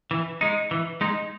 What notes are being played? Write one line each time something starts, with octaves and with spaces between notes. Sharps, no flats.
E3
G#3 D#4
E3
G#3 D#4